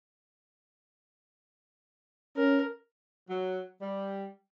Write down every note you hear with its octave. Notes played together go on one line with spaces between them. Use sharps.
C#4 A#4
F#3
G3